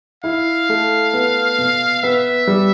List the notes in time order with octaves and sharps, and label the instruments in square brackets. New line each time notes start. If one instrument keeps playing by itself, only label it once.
[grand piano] E4 [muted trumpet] F5
[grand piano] A3
B3
B2
[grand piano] B3 [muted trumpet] E5
[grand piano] G3